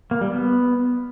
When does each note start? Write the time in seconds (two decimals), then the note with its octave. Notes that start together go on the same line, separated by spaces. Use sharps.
0.11 A#3
0.21 G3
0.31 B3